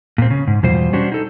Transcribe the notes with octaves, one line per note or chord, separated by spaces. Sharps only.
A#2 C4
C#3
G#2
E2 B2 G3 F4 C5
G3 C#4 D4 F#4 G4 C5
D#4 A4